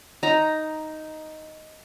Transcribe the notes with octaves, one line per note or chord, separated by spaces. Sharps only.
D#4 A#5